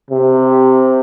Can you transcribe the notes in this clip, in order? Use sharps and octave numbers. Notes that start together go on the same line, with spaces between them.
C3